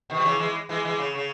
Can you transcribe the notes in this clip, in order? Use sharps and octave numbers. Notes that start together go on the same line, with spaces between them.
B2 D#3
G3
C#3 E3
E3 G#3
E3 G#3
E3 G#3
C#3
C#3